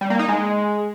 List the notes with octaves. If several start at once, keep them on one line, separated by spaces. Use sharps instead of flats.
G3
A#3
D#4
G#3